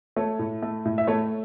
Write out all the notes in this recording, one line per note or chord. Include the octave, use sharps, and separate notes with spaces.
A3 A4 C#5
A2
A3
A2
E5
A3 A4 C#5